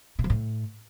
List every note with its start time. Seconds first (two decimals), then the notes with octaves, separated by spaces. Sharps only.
0.19 A#2
0.24 F3
0.30 A2